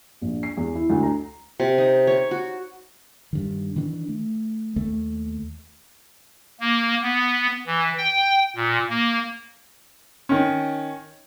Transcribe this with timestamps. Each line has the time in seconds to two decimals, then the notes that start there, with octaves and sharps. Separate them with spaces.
0.22 A#1
0.43 C7
0.57 E2
0.75 E4
0.90 D2
1.03 A#5
1.60 C3
1.78 D#4
2.07 C#5
2.31 F#4
3.33 G2 D#3
3.76 D#3 E3 D4
4.09 A3
4.76 D#2 A3
6.60 A#3
7.03 B3
7.67 E3
7.97 G5
8.56 A#2
8.90 A#3
10.29 D#3 C#4